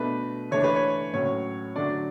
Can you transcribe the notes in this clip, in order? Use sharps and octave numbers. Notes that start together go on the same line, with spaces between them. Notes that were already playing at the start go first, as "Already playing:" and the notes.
Already playing: B2 A3 D4 B4
E3 A3 D4 C#5
B4
C#5
A2 F#3 C#4 C#5
D3 F#3 A3 D4 D5